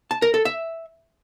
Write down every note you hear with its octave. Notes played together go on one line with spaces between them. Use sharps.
A5
A#4
A4
E5